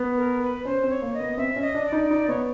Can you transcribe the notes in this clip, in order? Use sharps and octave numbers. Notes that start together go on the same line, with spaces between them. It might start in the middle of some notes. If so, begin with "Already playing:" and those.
Already playing: B3
A#4
B4
C#4 C5
C4
C#5
A#3
D#5
B3
C4 E5
C#4
D#5
D4
D5
D#4
D#4 D5
B3 C#5